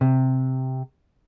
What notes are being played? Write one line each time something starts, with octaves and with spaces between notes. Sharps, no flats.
C3